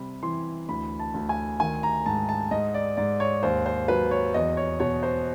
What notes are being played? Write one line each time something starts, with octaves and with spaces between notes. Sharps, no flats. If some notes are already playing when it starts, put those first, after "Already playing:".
Already playing: C3 G3 B5
E3 C6
D2 B5
A5
D2
G#5
D#3 G#5
A#5
G#2 A5
A5
G#2 D#5
D5
G#2 D5
C#5
D#2 C5
C5
F#3 B4
C#5
E2 D#5
C#5
B2 C#5
C5